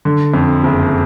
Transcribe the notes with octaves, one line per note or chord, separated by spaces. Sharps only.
D3
F2
F#1